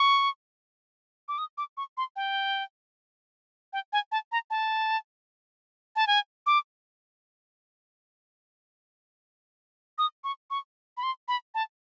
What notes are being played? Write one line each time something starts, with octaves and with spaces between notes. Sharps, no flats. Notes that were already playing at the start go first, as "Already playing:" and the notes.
Already playing: C#6
D6
D#6
D6
C#6
C6
G5
G5
G#5
A5
A#5
A5
A5
G#5
D6
D#6
C#6
C#6
B5
C6
B5
A5